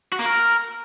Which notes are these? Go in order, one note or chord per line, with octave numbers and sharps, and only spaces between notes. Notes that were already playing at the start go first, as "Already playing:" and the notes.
F#4
A#3
A#4